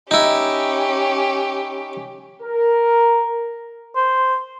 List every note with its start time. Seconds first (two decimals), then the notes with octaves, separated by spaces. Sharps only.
0.11 C#4 D#4 E4 G4
2.42 A#4
3.96 C5